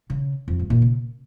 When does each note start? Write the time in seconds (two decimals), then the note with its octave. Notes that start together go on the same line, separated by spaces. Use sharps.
0.10 C#3
0.48 F2
0.59 G#2
0.70 A#2
0.82 C#3